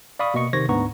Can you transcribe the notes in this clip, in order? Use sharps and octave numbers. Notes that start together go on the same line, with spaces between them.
D5 F5 B5 C#6 D#6
B2 A#3 D#5 C#6 C#7
C3 D#3 C5 C#6 G#6 A#6
D2 G#2 B3 D4 A#5 C#6